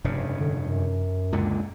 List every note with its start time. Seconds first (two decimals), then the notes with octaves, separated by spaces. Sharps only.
0.04 F1 G2 C#3
0.39 D3
0.61 F#2
1.32 C#2 A#2 D3